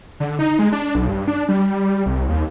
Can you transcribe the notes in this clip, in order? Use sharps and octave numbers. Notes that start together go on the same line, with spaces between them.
D3
D#4
G#3
D4
B1
G2
D4
G3
C2
D#2